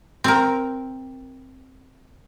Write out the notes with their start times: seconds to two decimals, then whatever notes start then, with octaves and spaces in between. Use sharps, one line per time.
0.24 C4 A#4